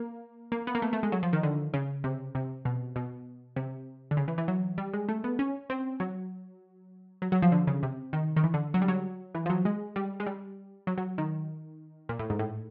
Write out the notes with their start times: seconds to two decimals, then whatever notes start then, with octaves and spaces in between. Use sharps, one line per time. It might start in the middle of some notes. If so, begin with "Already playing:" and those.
Already playing: A#3
0.52 A#3
0.67 B3
0.75 A#3
0.82 A3
0.93 A3
1.03 G#3
1.12 F#3
1.23 F3
1.33 D#3
1.43 D3
1.74 C#3
2.04 C3
2.35 C3
2.65 B2
2.96 B2
3.56 C3
4.11 D3
4.17 C#3
4.28 E3
4.38 E3
4.48 F#3
4.78 G3
4.94 G#3
5.09 A3
5.24 B3
5.39 C#4
5.70 C4
6.00 F#3
7.22 F#3
7.32 F#3
7.42 F3
7.52 D3
7.67 C#3
7.83 C3
8.13 D#3
8.36 D#3
8.44 E3
8.54 D3
8.74 F#3
8.82 G3
8.88 F#3
9.35 E3
9.46 F3
9.50 F#3
9.65 G#3
9.96 G3
10.20 G#3
10.27 G3
10.87 F#3
10.98 F#3
11.18 D#3
12.09 A#2
12.19 A2
12.30 G#2
12.39 A2